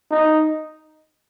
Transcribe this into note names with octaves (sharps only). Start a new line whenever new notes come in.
D#4